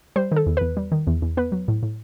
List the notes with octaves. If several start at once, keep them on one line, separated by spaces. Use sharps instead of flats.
G3 C5
D#3 A4
E2
E2 B4
G3
D#3
E2
E2
B3 B4
F#3
A2
A2